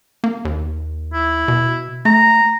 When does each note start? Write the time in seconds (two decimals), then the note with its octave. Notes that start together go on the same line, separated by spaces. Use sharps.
0.24 A#3
0.45 D#2
1.13 E4
1.48 B2
2.05 A3 A#5